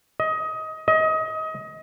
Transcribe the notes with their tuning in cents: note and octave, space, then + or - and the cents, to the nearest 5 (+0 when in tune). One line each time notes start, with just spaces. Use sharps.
D#5 +20
D#5 +25